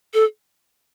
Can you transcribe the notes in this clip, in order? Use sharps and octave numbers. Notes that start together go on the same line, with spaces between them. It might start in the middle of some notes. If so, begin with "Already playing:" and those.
A4